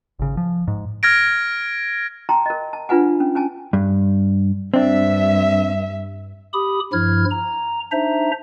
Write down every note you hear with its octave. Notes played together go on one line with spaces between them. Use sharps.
G#1 C#3
F3
G#2
F6 G#6 A#6 D7
G5 A5 A#5 C6
A#4 D#5
A5
D4 F4 B4 F#5 G#5
C#4
C#4 G#5 A5
G2
G2 C4 D4 E5
G4 B5 D#6
G2 F3 E4 F6 G#6
A#5
D4 D#4 C5 E5 A#5